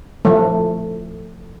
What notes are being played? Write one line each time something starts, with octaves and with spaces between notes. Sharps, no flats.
F3 A3